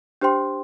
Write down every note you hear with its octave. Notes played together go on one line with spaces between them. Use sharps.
D4 G4 C5 G5 C6